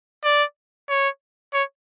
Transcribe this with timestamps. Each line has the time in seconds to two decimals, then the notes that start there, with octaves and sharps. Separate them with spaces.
0.24 D5
0.89 C#5
1.53 C#5